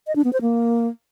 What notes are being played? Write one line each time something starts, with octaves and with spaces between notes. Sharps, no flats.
D#5
D4
B3
C5
A#3